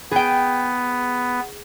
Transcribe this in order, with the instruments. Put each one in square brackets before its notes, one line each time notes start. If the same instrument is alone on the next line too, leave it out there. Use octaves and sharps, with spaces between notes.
[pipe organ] B3 [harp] G#4 G5